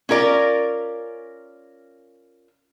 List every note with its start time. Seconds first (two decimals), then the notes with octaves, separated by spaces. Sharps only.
0.09 C#4 F4 A#4 D5